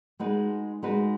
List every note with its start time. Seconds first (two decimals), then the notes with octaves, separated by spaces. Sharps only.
0.19 G#3 D#4 F#4 B4
0.83 G#3 D#4 F#4 B4